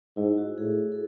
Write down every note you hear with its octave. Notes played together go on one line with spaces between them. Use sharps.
G#2 E4
F#4
A2 G#4
A4